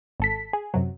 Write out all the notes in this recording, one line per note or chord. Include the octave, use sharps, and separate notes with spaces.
G#1 A4 B6
G#4
F#2 C3 F#3